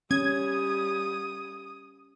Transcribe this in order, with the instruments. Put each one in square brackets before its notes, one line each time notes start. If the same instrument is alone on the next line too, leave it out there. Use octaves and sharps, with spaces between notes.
[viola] G3 [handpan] C#4 [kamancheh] D#6 [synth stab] G#6